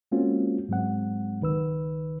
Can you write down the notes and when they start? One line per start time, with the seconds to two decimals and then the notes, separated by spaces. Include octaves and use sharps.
0.12 G#3 A#3 C4 C#4 F4 F#4
0.69 G#2 F#3 G#3 C4 F#5
1.41 C#2 D#3 B4 E6